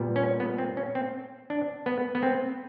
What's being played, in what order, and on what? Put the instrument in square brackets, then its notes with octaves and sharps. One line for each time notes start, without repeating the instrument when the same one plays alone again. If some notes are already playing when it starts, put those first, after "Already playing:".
Already playing: [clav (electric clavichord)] A#2 G3 B3
C#4
B3
C4
C#4
C4
D4
B3
B3
C4